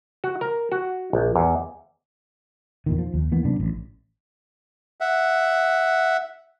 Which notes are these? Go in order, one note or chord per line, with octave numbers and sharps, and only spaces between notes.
F#4
A#4
F#4
A#1
E2
E2 A#2 D#3
F3
D#2
E3 A#3 B3
F#2 C3 B3 D4
A1
E5 F#5